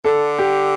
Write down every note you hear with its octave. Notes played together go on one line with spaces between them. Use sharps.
D3 A4
G4